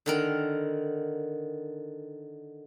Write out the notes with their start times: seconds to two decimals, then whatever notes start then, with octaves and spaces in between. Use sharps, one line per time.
0.06 D3 D#3 A#4